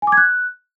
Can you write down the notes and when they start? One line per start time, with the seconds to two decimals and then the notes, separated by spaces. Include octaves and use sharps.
0.02 G#5
0.07 D6
0.12 G#6
0.17 F#6